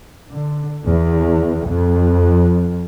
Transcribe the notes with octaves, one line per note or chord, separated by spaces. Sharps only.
D3
E2
F2